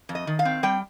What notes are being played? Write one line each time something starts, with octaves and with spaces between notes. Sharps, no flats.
F2
D#5
D#3
F5
C4
G3 G5